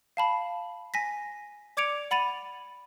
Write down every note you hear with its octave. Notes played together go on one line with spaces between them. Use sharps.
F5 A5 B5
G#5 A#6 B6
D5 D6 G#6 C#7 D7 F7
F#5 B5 A6 D#7 F7